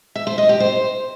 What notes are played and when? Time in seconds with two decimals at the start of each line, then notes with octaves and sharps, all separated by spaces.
0.15 E5
0.27 C5
0.38 D#5
0.49 G4
0.60 C5